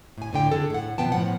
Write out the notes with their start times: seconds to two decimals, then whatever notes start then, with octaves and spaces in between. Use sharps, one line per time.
0.18 A2 G#5
0.33 A2 D3 G5
0.52 D3 G#4 A4
0.70 A2 F#5
0.98 B2 F3 B3 G5 A5
1.12 A2 F3 F#5